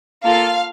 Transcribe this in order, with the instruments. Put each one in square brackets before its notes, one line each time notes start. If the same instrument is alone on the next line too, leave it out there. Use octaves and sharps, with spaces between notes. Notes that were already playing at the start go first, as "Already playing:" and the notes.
[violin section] A#3 F4 A4 F5